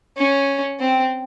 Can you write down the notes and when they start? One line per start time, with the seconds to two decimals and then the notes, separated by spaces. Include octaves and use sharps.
0.18 C#4
0.80 C4